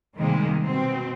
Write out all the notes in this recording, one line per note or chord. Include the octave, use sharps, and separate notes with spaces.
C3 D#3 G3 G#3 A#3
B2 C4